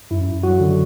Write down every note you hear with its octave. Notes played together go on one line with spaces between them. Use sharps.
F#2 E4
F#2
F#3 F#4
D3